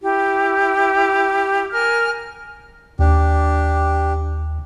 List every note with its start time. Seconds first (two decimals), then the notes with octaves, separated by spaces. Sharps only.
0.02 E4 G4
1.72 A#4 G#5 F6
2.99 D#2 D4 G4